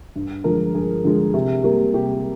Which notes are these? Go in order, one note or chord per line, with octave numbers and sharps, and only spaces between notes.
G2
D3 F3 G#3 A#4
G2 G#4
D3 F3 G#3
C3
G3 A#3
C3 G4